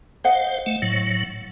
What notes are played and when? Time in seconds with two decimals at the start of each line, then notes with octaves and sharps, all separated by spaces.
0.24 C5 D#5 F5 F#5
0.66 A3
0.82 A2 F#3